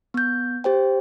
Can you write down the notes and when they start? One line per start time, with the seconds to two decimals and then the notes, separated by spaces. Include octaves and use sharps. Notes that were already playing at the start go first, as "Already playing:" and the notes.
0.14 B3 G6
0.64 G4 C5 G5